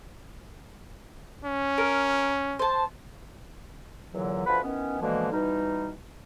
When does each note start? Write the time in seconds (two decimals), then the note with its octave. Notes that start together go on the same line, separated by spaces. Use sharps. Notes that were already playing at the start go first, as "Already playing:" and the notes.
1.45 C#4
1.78 A#4
2.59 C5 A5
4.13 E2 A#2 D3 E3 F#3
4.46 D2 F3 B4 F#5 B5
4.63 D#3 E3 B3 C#4
5.00 B2 D3 E3 F3 G#3 A#3
5.32 B2 E3 G3 D#4